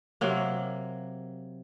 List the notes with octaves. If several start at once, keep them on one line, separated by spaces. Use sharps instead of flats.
C3 F#3 A#3